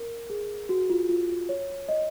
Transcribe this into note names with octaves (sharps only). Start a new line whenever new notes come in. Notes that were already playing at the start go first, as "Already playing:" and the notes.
Already playing: A#4
G#4
F#4
F4
F4
F4
C#5
D#5